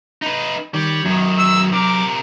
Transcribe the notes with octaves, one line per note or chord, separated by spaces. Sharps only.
D#4 B4
D#3 G3 C#5
F#2 D#3 F#3
E6
C3 A#4 D6